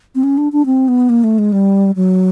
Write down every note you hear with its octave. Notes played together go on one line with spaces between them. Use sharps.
C4
C#4
D4
D4
C4
B3
A#3
A3
G#3
G3
F#3